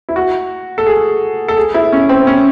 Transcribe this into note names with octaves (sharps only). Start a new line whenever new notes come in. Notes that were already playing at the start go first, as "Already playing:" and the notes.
E4
F#4
A4
G#4
A4
G#4
E4
C#4
C4
C#4